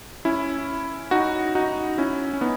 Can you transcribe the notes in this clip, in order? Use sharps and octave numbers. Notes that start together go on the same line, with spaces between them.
C#4 E4
D#4 F#4
D#4 F#4
C#4 E4
C#4
B3 D#4